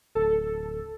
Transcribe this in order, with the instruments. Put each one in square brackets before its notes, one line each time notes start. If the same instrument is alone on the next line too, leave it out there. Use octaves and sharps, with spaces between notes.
[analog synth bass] D1 [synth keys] A4